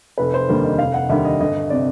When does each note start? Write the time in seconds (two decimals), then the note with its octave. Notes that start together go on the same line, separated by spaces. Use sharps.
0.18 F1 B4
0.34 C5
0.49 D#2 D3 G3 A#3
0.64 D#5
0.79 F1 F5
0.94 F#5
1.09 D#2 D3 G3 E5
1.25 D#5
1.40 G1 D#5
1.70 C3 D5